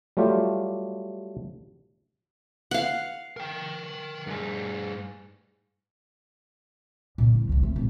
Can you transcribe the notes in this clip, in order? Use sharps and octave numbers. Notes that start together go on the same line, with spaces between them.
F#3 G3 A3 F4 G4
F5 F#5
A#4 G5
G2 G#4
A#2 C#3
F3 E4
C2 D#3
A3
A1 A#2